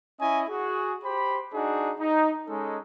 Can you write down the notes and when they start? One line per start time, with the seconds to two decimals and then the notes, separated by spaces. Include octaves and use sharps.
0.21 C#4 E4 D#5 G#5
0.49 F#4 G#4
1.04 G4 C5 B5
1.54 D4 D#4 F#4 G#4
1.99 D#4
2.48 G#3 C#4 D#4 A4